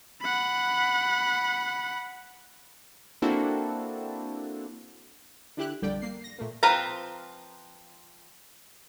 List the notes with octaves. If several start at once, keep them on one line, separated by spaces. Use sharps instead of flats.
F#5 B5
A#3 C4 D4 E4 F#4 A4
D3 E4 G4 F#6
A#1 F2 D3 G3 D5 G5
A#3 C7
A#6
A#2 A3 A#3
F3 C4 F4 B4 A#5